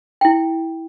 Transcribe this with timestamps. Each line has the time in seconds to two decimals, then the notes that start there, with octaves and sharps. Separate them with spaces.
0.21 E4 G5